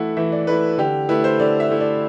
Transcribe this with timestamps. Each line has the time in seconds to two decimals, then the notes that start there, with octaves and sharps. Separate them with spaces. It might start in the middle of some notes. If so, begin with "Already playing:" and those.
Already playing: E3 A3 E4 F#5
0.17 E3 E5
0.32 D5
0.47 A3 E4 B4
0.78 D3 G4
1.09 A3 E4 B4
1.24 C5
1.40 D3 D5
1.60 E5
1.70 A3 E4
1.81 D5